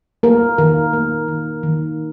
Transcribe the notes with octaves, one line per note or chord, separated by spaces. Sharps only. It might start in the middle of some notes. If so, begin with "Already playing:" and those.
A#3 A#4
D#3 A#4
A#3
D#3
D#3